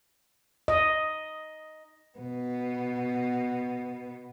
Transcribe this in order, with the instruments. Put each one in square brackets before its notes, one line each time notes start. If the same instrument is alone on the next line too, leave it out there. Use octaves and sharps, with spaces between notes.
[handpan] D#5
[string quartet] B2 B3